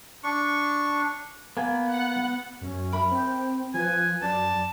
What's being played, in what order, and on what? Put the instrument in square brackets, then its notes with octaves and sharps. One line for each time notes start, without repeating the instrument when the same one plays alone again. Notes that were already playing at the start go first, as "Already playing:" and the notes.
[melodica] D4 C#6
[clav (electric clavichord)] A#3 G#5 [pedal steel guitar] B3
[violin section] F#5
[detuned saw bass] F#2 [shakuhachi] C#4
[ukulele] A#4 E5 B5
[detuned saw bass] C4 [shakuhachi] G5
[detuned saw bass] F3 [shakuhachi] B4 [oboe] G#5
[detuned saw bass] F#2 [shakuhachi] D5 [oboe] A5